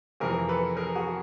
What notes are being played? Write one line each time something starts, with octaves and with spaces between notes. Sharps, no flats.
F2 C3 E3 G#4 A#4
A4 B4
G#4 A#4
F#4 G#4